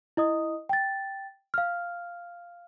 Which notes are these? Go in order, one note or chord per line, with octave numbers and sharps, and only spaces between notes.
E4 D#5 D#6
G5 A6
F5 F6